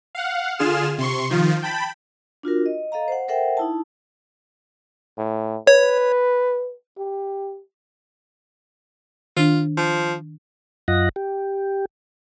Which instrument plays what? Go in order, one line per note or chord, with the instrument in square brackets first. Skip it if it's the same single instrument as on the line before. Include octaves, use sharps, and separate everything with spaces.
[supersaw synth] F5 F#5
D3 F4 G#4 F6 E7
C3 C6 C#6
D#3 F3 F4
G5 A5 B5
[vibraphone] D4 F4 F#4 A#4
D#5
A4 D#5 F5 A#5
C5 F#5
A4 A#4 C5 E5 F#5 G5
D#4 E4 A5
[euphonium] A2
[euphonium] B4 [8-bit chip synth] C#5
[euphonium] G4
[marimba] D#3 D4 [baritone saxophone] F4
[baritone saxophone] F3
[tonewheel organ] F#2 F4 D#5 F#5 A#6
G4